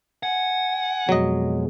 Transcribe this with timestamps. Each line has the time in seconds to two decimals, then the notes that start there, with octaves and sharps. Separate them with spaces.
0.23 F#5 G#5
1.09 F2 B2 F#3 G#3 D#5